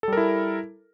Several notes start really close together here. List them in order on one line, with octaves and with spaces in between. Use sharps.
A4 G3 A#4 E4